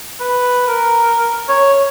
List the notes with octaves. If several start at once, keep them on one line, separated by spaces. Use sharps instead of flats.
B4
A#4
C#5